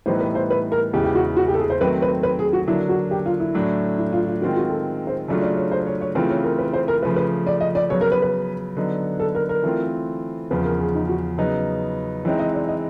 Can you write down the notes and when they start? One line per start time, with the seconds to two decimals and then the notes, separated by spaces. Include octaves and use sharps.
0.06 A2 E3 G3 B3 D#4 C5
0.20 B4
0.35 C5
0.50 B4
0.72 A#4
0.93 E2 C#3 E3 G#3 G4
1.04 G4
1.15 F#4
1.37 F#4
1.48 G4
1.54 A4
1.59 G#4
1.70 C5
1.80 D#3 F#3 A3 C4 B4
2.02 B4
2.23 B4
2.39 G#4
2.53 F#4
2.67 D3 F#3 A#3 D4 E4
2.89 F#4
3.11 G4
3.26 F4
3.40 E4
3.55 A2 F#3 A3 D4
3.98 E4
4.13 F4
4.26 F4
4.42 D#3 G#3 C4 F4 F#4
4.57 F#4
4.70 A4
5.07 C5
5.28 C#3 F#3 A3 D4 F4 D5
5.42 D5
5.57 C#5
5.71 C5
5.87 C#5
6.01 C#5
6.15 C#3 E3 A3 C4 F4 B4
6.30 C#5
6.44 A#4
6.59 B4
6.73 C5
6.88 A#4
7.03 C#3 F3 A3 B4
7.16 B4
7.47 D5
7.60 D#5
7.75 D5
7.89 C#3 F#3 B3 C#5
8.01 A#4
8.12 B4
8.22 B4
8.77 D3 F#3 B3 D#4
9.19 A4
9.35 A#4
9.49 A#4
9.64 E3 A3 C4 F4
10.51 E2 C#3 F3 B4
10.65 A#4
10.80 G#4
10.94 D#4
11.09 F#4
11.38 C#3 F#3 B3 D#4
12.24 E3 G#3 C4 D#4 C#5
12.39 D#5
12.54 D5
12.68 D#5